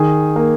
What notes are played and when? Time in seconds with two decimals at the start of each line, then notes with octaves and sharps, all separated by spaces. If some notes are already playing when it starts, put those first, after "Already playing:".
Already playing: D#3 G#4 G#5
0.36 A#3